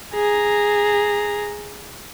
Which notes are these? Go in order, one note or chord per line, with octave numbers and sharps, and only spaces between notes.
G#4 A#5